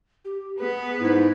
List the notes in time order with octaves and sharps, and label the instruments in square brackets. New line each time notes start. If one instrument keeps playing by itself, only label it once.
[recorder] G4
[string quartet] B3 B4 [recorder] G#4
[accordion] G#2 [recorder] E4